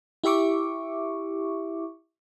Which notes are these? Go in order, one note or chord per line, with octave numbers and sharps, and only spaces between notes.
E4 G4 E5 C#6 D6